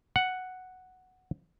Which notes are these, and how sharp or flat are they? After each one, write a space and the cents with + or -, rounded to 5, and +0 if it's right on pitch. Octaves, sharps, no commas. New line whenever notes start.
F#5 +0